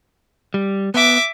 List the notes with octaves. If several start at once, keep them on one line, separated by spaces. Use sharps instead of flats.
G3
B3 E5 D6